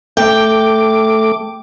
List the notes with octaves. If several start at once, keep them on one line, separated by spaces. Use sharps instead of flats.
A3 G5 D6